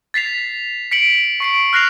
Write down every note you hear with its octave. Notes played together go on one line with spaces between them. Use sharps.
A6 B6 C7 F7
B6 C#7 D7 F#7
C#6 C7 D7
F6 F#6 A#6 C7 F7